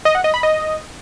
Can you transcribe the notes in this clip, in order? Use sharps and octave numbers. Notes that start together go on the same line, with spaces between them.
D#5
F#5
D#5
B5
D#5